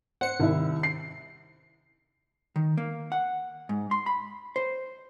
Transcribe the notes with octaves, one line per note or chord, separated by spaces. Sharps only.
C5 F#5 C#7
C2 D#3 E4 E5
C7
D#3
A#3
F#5
G#2
C6
B5
C5